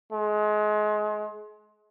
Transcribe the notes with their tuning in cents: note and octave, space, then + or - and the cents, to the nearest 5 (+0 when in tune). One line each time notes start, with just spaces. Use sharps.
G#3 +30